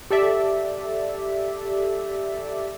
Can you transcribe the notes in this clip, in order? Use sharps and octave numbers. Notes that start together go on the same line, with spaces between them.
G4 A4 D5 E5